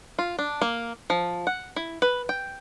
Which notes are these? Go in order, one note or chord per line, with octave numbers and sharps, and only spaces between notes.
F4
D4
A#3
F3
F#5
E4
B4
G5